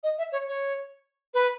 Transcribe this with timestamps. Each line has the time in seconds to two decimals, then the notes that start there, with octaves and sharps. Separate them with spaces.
0.03 D#5
0.18 E5
0.32 C#5
0.47 C#5
1.34 B4